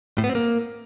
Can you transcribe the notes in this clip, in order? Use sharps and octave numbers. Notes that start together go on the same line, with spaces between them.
A2
B3
C4
A#3